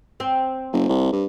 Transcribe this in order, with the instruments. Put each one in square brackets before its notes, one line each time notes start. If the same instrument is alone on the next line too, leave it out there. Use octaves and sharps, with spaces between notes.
[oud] C4
[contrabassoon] F#1
C2
G2